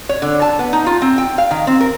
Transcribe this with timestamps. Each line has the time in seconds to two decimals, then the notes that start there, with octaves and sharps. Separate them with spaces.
0.09 C#5
0.22 D3
0.42 A5
0.59 B3
0.73 D#4
0.86 F4
1.02 C4
1.18 G5
1.38 F5
1.51 D#3
1.67 C4
1.81 A#4